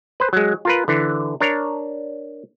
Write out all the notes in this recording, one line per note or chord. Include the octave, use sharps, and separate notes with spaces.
B4 C5
F#3 G#3
F4 A#4 B4
D3 E3
D4 A#4 C#5